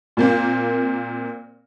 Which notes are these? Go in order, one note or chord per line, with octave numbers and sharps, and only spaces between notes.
A#2 A#3 C4